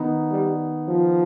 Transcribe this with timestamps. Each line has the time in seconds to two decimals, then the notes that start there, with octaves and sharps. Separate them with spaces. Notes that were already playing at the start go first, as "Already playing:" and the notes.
Already playing: D#3 B3 D#4
0.31 G3
0.88 F3